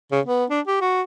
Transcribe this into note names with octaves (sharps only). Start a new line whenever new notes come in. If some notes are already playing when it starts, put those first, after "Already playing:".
C#3
B3
D4
G4
F#4